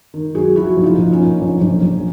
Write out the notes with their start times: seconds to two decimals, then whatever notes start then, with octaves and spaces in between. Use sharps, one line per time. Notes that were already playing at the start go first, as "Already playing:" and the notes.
0.14 D#3
0.35 F#3 F#4 G#4
0.55 F3 E4 F#4
0.77 A#1
0.84 D#4 F4
0.98 A#1
1.12 C#4 D#4
1.19 A#2
1.41 A#1
1.61 A#1
1.83 A#1